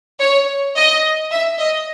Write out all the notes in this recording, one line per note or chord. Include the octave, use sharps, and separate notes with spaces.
C#5
D#5
E5
D#5